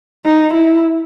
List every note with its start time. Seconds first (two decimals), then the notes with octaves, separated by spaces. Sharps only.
0.25 D#4
0.54 E4